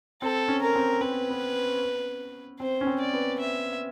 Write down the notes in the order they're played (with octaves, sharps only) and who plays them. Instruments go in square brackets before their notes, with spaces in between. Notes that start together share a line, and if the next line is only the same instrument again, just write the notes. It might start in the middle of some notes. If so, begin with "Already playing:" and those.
[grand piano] C4 [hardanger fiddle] A4
[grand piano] C#4
[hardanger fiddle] A#4
[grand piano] C4
[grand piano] C4 [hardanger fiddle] B4
[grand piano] B3
B3
[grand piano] C4 [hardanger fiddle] C5
[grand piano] C#4
C4
[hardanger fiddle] D5
[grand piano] B3
[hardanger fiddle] E5